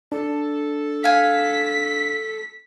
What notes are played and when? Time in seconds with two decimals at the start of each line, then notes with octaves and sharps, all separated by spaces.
0.12 D4 A4
1.04 F5 G#5 B6